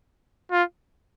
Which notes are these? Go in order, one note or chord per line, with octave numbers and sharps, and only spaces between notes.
F4